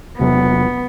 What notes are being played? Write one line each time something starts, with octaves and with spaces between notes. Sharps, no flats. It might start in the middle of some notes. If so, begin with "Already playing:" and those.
E1 C3 F#3 B3